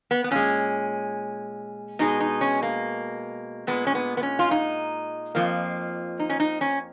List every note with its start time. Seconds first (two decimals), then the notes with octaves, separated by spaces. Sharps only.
0.11 B3
0.24 B3
0.31 A#2 G#3 C#4
1.99 B2 G#3 D#4
2.20 D#4
2.41 C#4
2.62 A#3
3.67 A#2 G#3 B3
3.87 C#4
3.95 B3
4.17 B3
4.23 C#4
4.39 F4
4.51 D#4
5.35 F2 F3 A#3
6.19 D#4
6.30 C#4
6.40 D#4
6.61 C#4